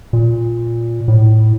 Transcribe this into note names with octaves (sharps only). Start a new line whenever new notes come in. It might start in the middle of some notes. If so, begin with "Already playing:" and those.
A#2
A2